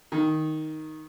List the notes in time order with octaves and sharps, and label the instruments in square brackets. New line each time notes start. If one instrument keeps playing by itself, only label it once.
[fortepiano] D#3